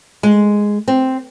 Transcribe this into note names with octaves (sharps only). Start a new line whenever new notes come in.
G#3
C4